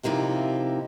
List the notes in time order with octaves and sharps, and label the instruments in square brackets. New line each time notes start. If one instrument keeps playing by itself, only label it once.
[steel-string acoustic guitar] C3 F3 A#3 D#4 E4